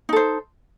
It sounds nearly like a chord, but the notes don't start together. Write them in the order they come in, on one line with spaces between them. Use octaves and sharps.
D#4 A4 C5